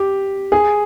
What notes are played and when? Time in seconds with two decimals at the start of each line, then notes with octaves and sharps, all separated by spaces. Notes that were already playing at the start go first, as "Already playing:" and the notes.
Already playing: G4
0.52 G#4